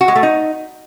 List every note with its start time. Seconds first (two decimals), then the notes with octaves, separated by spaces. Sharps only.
0.01 F#4
0.08 G#3
0.15 A3
0.23 D#4